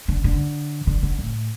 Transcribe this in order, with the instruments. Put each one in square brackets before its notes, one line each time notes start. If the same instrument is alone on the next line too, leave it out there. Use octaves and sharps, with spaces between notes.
[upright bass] D3
D3
D3
D3
A2